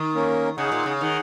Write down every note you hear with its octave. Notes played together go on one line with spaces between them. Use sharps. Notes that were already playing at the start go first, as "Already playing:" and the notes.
Already playing: D#3
A#3 C#4 A#4
C#3 D#4 G#4 F#5
A#2
C#3
D#3 D#4 G#4 F#5